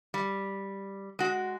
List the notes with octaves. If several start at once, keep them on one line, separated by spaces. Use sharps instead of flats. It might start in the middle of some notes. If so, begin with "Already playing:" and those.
G3
G#3 F#4